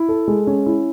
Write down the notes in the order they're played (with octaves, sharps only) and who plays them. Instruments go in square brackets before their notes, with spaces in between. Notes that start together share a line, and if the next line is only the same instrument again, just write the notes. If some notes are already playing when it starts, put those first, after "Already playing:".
Already playing: [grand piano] E4
A4
G#3
C#4
E4